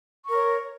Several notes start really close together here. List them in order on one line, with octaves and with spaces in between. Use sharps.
C#6 A#4 C#5